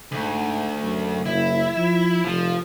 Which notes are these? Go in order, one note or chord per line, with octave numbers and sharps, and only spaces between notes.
D2 G#2
F#2
F#1 E4
F3
F1 F3